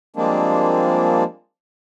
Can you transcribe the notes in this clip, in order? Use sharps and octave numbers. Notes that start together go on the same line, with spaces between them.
F3 G3 G#3 A#3 C4 D4